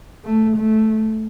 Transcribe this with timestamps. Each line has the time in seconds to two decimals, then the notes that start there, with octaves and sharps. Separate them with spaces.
0.25 A3
0.57 A3